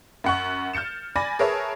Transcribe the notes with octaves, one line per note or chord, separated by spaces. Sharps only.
F#2 F#5 C#6
F6 G6 A6 C#7 E7
D5 G#5 B5 D6 A6 A#6
G#4 A#4 B4 C#5 E5 A5